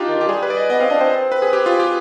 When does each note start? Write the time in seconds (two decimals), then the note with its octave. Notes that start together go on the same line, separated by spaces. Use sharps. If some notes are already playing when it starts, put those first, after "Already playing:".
Already playing: D4 D#4 F4 G4
0.08 D#3
0.18 D#3 G4
0.28 G3 G#4
0.43 B4
0.50 D5
0.57 D#5
0.70 B3 D#5
0.80 C4 F5
0.90 D4 D#5
1.01 C4 C5
1.32 B4
1.42 G#4
1.53 G4
1.66 F4
1.80 G4